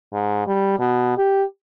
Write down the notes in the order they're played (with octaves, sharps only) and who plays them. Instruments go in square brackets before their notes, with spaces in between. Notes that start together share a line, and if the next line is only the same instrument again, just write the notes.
[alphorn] G#2
G3
B2
G4